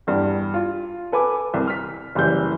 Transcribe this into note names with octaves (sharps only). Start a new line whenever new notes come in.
E2 G2 G3
F4
A4 B4 G#5 D6
C2
F6 B6
F#1 C#3 E3 G3 G6